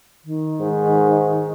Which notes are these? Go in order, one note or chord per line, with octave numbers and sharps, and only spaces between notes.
D#3
G#2